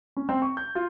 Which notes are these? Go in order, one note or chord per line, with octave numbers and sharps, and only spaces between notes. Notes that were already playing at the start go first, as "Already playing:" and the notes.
C#4
C4
C#6
G6
F4